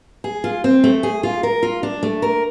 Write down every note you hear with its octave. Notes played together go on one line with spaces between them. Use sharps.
G#4
F4
C4
A3
G#4
F4
A#4
F4
D4
A3
A#4